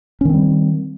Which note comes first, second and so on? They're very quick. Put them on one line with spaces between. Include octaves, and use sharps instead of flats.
C#4 D#3 C4 G3